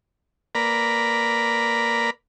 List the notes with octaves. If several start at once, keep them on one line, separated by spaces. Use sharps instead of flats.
A#3 A#4 B4 D5 A#5 B5